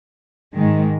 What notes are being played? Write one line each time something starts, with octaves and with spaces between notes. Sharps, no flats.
G#2 D#3 G#3